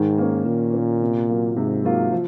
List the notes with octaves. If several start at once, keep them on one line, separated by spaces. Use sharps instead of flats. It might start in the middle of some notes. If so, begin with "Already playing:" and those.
Already playing: G#2 D#3
A#3 C#4
A#2 D#3
A#3 C#4
C3
F#3 A#3 F4
G#2 C3
F#3 A#3 F4
F3